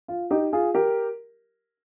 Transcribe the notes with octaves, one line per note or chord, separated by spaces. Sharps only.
F4
D#4 G4
F4 G#4
G4 A#4